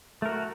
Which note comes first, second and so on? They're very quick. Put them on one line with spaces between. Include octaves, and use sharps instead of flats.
A3 A#4 F#4